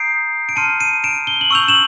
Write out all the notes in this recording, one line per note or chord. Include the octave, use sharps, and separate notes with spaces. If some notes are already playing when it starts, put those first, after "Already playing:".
Already playing: A#5 D#6 G6 C7 D7
D7
A5 C6 F6 C#7 D#7
C#7 D#7
D7 E7
G7
F#7
C#6 E6 G6 F7
E7 F#7